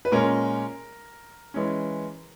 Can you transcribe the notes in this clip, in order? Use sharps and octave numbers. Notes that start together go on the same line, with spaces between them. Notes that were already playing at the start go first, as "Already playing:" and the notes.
B4
A#2 G#3 C#4 A#4
E3 G#3 C#4